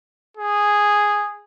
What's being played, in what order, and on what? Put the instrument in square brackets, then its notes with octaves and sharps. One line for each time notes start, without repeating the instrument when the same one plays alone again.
[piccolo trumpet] G#4